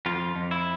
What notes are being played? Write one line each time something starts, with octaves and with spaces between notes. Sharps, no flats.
F2 F4
F2
E4